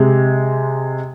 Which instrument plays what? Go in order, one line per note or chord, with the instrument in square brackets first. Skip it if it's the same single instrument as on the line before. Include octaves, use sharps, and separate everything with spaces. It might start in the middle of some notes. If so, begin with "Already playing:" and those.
Already playing: [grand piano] C3 G#3